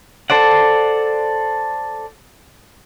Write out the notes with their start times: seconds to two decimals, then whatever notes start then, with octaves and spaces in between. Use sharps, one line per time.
0.30 A4 C5 D5 F#5